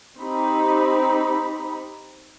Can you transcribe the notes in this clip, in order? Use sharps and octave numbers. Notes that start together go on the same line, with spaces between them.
C4 D#4 G4 B5